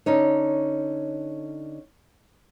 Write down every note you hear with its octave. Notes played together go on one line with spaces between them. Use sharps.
D3 C#4 D#4 C#5